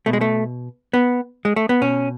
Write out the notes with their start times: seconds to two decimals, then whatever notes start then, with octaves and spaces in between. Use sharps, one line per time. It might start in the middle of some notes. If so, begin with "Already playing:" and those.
0.06 B2 A3
0.13 G#3
0.21 A3
0.93 B3
1.45 G#3
1.56 A3
1.69 B3
1.82 B2 C#4